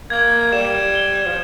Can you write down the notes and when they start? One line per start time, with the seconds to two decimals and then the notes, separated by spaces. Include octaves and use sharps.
0.10 A#3 G#6
0.52 G3 E7
0.95 G7
1.26 F3